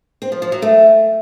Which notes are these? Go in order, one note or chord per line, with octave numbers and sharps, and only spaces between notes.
C4
F3
F3
F#3
A3